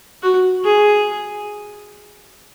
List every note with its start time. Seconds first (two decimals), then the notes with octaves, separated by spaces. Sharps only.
0.23 F#4
0.64 G#4